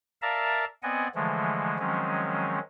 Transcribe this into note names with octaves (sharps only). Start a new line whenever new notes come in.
A#4 D5 E5 F5 A5 A#5
B3 C4 D5 D#5 F#5 G#5
D3 E3 F3 G#3 A3
D#3 F3 F#3 G#3 C4 C#4